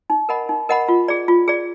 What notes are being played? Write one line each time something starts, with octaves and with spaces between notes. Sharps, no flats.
D#4
A#4 D#5 F#5 B5
D#4
A#4 D#5 F#5 B5
F4
G#4 D5
F4
G#4 D5